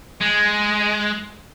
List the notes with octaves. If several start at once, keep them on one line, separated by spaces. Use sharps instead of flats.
G#3